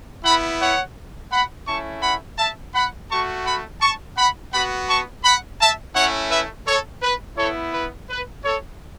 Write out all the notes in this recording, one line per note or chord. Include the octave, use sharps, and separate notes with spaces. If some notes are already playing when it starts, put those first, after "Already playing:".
B3 E4 F#5 B5
C#5 F#5
F#5 B5
A3 C#4 E4 A5 C#6
F#5 B5
E5 A5
F#5 B5
A3 F#4 A5 C#6
F#5 B5
A5 C#6
F#5 B5
B3 F#4 F#5 B5
A5 C#6
F#5 B5
E5 A5
A3 C#4 E4 C#5 F#5
B4 E5
A4 C#5
B4
B3 E4 A4 C#5
B4
B4
A4 C#5